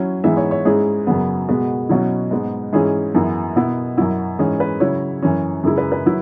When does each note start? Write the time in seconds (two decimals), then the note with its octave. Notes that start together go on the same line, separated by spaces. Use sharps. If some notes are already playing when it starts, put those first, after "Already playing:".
Already playing: F#3 C#4 E4
0.24 G#2 E3 G#3 B3 E4 E5
0.37 C#5
0.51 C#5
0.65 G#2 G#3 C#4 E4 G#4
1.07 F#2 C#3 F#3 B3
1.49 B2 G#3 B3 F#4
1.89 B2 F#3 C#4 E4
2.31 G#2 G#3 B3
2.73 G#2 E3 C#4 E4 G#4
3.15 F#2 E3 B3 E4
3.56 B2 B3 E4
3.97 F#2 F#3 E4 F#4
4.39 G#2 E3 C#4 G#4
4.60 B4
4.80 C#3 F#3 E4 C#5
5.22 F#2 E3 C#4
5.64 F#2 C#3 G#3 E4
5.78 B4
5.92 B4
6.06 F#3 E4